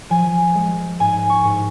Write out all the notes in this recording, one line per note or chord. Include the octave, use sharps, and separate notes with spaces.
F3 G#5
G#3
G#2 G#5
C#6
G#2